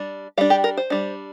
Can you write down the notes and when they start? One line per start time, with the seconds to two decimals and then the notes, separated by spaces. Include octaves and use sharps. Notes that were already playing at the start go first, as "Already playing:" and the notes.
Already playing: G3 D4
0.37 G3 F5
0.41 D4
0.50 G4
0.64 A#4
0.77 C5
0.90 G3 D4